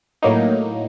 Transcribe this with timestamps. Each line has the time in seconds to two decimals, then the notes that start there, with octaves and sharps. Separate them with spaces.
0.22 A2 F#3 A#3 D#4